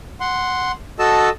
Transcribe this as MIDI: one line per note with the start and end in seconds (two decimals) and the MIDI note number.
0.20 0.72 78
0.20 0.72 84
0.99 1.29 66
0.99 1.29 69
0.99 1.29 75
0.99 1.29 81
0.99 1.29 88